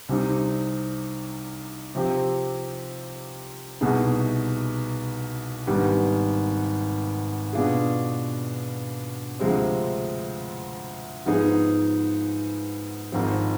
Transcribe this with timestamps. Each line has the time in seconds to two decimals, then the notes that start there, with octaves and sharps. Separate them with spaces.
0.09 C2 C3 G3 C4 D#4
1.95 C3 F3 C4 G4
3.81 C2 B2 B3 D#4 G#4
5.67 G#1 G2 D#3 G3 B3
7.53 B2 B3 D4 F4 G#4
9.39 D2 C3 F3 G#3 C4
11.26 G#2 F3 B3 D#4 G#4
13.12 G#1 G#2 F3 C4